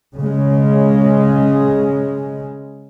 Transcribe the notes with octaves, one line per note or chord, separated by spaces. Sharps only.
C#3 G#3